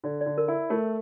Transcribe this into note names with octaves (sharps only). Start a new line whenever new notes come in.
D3 D5
D5
D3
A#4
E4
A3 A#4